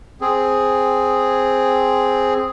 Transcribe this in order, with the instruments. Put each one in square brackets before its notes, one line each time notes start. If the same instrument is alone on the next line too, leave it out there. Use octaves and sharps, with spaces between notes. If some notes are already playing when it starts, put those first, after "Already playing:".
[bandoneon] C4 G#4